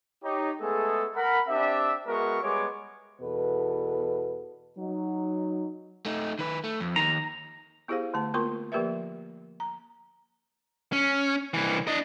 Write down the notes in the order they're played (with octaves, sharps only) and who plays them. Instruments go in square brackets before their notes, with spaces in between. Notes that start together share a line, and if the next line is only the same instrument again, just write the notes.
[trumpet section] D#4 G4 C#5
G#3 A3 B3 G#4 A4
A#4 F#5 B5
C4 D4 G4 E5
G#3 B3 F#4 A#4 E5 C#6
G3 G#3 B3 C#5 D6
[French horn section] E2 B2 A4 B4
F#3 D#4
[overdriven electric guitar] A3 D#4
D#3 B4
A3
F2
[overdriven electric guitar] D#2 D#3 [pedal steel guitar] A#5
[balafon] B3 E4 G4 G#4 C5 F5
D3 A3 A5
A#3 B3 F4 A#4 C6 C#6
F3 A#3 G4 A#4 B4 E5
A#5
[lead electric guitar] C#4
C2 E3
D4 D#5